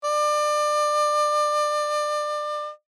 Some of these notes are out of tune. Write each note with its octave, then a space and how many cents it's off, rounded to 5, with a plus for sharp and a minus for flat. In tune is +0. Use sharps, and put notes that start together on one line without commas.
D5 +30